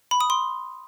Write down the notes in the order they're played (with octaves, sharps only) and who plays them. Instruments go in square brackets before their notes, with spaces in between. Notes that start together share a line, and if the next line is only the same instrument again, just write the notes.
[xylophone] B5
D#6
C6